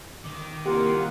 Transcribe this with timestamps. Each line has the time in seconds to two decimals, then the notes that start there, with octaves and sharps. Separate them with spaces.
0.24 D#3 D6
0.66 C2 A#3 F4 G4 F#5